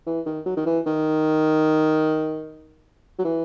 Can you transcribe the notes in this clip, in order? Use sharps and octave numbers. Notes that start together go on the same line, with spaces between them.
E3
D#3
F#3
D#3
E3
D#3
F#3
E3